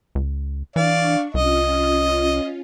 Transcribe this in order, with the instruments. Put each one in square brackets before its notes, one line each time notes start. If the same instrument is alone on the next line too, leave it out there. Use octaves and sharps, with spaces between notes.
[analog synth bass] C#2
[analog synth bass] E3 [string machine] D4 C#6 [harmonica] D5 F5
[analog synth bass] C2 [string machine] C#4 F4 [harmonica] D#5